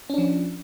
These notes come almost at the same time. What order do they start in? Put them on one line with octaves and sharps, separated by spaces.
C#4 D4 F3